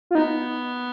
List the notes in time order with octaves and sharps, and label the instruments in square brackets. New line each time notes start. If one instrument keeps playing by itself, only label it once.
[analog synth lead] F4
[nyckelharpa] B3 [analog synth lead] D#4